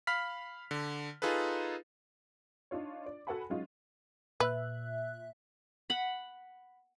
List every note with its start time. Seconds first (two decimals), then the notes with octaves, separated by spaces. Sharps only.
0.07 F5 B5 F6 B6
0.71 D3
1.22 D#4 F4 G#4 A4 B4
2.71 D4 D#4 F4 C#5
3.06 D5
3.27 F#4 A4 B4 F#5 G#5 B5
3.50 F#3 G#3 C#4 D#4 F4
4.40 A#2 B4 E5 F#6
5.90 F#5 B5